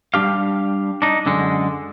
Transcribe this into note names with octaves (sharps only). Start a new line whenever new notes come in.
G3 D4 G4 F5
D4 D#4
F#2 D3 G#3